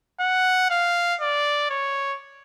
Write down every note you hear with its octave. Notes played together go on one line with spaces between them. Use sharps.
F#5
F5
D5
C#5